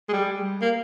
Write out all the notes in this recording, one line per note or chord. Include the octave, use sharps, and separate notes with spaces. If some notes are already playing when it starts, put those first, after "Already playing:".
G#3
G3
A#3